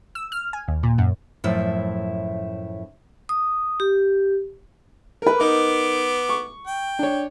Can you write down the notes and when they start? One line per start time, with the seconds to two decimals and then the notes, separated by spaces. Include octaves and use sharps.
0.15 E6
0.32 F6
0.53 G#5
0.68 D#2
0.83 A#2
0.98 F#2
1.44 F#2 A2 F3 E4 E5
3.29 D#6
3.80 G4
5.22 A#4 B4
5.40 B3 D#4 A#4 D6
6.29 C#6
6.67 G5
6.99 D4 C#5